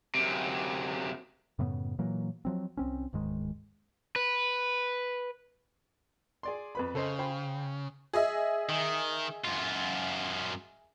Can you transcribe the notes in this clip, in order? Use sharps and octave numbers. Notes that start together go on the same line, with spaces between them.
F#2 C3
F#2 A2 C#3 B3
A#2 E3 F#3 A#3
F3 F#3 C4
C2 C4 C#4
D1 G#2 D#3 G#3
B4
G#4 D5 C6
F2 B4 B5
C#3 A4 C5 D#5
C5 G5 B5
G#4 D#5 E5
D#3
F#2 F4